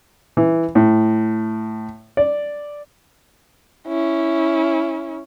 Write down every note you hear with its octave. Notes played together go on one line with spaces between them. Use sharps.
E3
A2
D5
C#4 E4